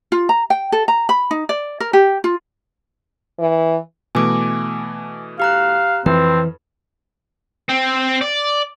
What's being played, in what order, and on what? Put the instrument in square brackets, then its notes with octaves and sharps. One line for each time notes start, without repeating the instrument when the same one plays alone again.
[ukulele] F4
A#5
G5
A4
A#5
B5
D#4
D5
A#4
G4
F4
[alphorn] E3
[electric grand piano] B2 E3 A3 [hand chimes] G#5 D6
[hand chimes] G4 A#5 F#6 [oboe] F5
[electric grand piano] F2 [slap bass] E3 [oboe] C4 [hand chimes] B4
[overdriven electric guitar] C4
D5